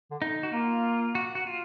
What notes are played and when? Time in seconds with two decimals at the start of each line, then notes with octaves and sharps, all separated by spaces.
0.11 D3
0.22 D#4
0.43 F#4
0.52 A#3 F4
1.15 F#4
1.35 F#4
1.47 F4